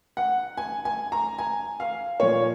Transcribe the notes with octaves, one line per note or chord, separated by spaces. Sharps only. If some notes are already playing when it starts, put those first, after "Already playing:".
F#5
G#5
G#5
A#5
G#5
F5
A#2 F3 C#5